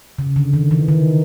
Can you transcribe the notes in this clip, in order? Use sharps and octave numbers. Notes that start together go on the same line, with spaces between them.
C#3
D3
D#3
E3
D#3